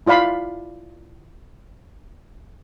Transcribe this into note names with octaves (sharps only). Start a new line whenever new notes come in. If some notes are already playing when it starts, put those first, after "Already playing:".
E4 F4 D5 F5 B5